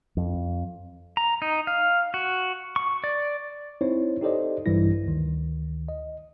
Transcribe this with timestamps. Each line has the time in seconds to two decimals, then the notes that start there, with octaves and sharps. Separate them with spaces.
0.17 F2
1.17 A#5
1.42 D#4
1.67 F5
2.14 F#4
2.76 C#6
3.04 D5
3.81 C4 D#4 E4 C5 C#5
4.21 D#4 G4 A4 C5 D5 D#5
4.66 A#1 G2 E3 G3 E4 A#6
5.06 D2 D#3
5.88 D#5